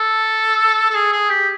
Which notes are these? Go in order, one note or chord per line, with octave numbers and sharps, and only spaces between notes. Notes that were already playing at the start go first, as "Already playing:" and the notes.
Already playing: A4
A4
G#4
G#4
G4